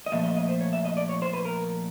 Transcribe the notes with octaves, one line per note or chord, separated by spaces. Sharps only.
D#5
A#2 F3 A3 E5
D#5
D#5
C5
C#5
E5
D#5
D5
C#5
C5
B4
A#4